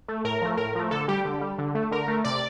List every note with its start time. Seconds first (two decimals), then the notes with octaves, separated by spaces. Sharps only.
0.08 A3
0.25 A2 A#4
0.42 F3 A3
0.57 A2 A#4
0.75 F3 A3
0.91 D3 A4
1.08 G3 G4
1.25 D3
1.41 G3
1.58 D3
1.75 A3
1.91 D3 A#4
2.08 A3
2.24 C3 D5